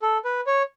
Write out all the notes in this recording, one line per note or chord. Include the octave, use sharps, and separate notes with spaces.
A4
B4
C#5